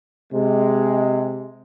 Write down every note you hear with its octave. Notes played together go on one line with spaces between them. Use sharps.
C3 G#3